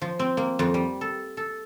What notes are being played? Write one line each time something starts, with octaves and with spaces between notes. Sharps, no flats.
F3
C4
A#3
F2
G3
A4
A4